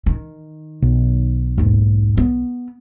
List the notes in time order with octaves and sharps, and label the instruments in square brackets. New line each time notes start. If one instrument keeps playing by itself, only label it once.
[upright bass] D#3
[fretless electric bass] B1
[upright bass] D#2 G#2
B3